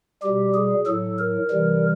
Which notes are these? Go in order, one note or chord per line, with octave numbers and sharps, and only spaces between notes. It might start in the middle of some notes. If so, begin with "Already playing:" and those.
B2 G3 G4
G#4
A2 F#3 A4
A#4
C3 E3 G3